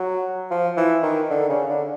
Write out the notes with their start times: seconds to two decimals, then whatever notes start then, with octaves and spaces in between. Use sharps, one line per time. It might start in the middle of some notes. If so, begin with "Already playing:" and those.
Already playing: F#3
0.51 F3
0.77 E3
1.03 D#3
1.30 D3
1.49 C#3
1.69 D3